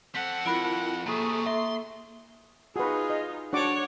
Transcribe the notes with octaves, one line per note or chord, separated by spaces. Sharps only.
C4 A4 F#5 B6
F2 E4 F4 A#4 B5 D7
C3 A3 A#3 G#4 C#6 D#6
E5 C6
D#4 F4 F#4 G#4 B4
D#5
D4 F#4 C#5 D5 F#5 D6